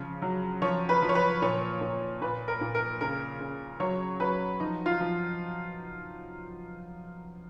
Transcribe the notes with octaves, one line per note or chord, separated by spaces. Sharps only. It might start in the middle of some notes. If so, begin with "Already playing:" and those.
Already playing: C#3 F3
F#3
F3 C#5
B4
F3
C#5
B4
A#2 C#5
A#2
A#2 B4
A#4
A#2
A#4
C#3 A#4
C#3
F#3 C#5
F#3 B4
F3 D#4
F4
F3